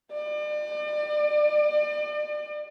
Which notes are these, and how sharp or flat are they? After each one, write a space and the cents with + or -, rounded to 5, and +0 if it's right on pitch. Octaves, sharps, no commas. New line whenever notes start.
D5 +40